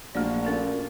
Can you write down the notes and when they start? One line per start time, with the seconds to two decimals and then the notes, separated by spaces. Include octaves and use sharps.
0.15 A#1 A3 F#4 D5
0.45 A#2 C#4 A4